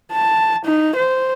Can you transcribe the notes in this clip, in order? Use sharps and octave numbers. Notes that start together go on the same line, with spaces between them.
A5
D#4
C5